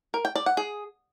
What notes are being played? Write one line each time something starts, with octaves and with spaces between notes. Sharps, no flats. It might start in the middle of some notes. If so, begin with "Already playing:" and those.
A#4
G5
D5
F#5
G#4